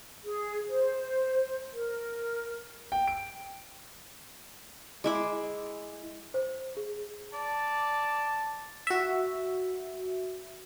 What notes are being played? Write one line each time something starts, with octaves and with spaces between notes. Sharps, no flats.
G#4
C5
A#4
G5
D7
G#3 E4 D6
C5
G#4
D5 A5
F#4 E5